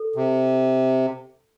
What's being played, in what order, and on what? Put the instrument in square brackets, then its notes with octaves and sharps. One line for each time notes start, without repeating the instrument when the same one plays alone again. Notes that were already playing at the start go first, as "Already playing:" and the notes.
Already playing: [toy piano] A4
[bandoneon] C3